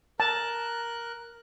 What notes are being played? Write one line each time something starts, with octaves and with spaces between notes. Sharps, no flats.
A#4 A5 F#6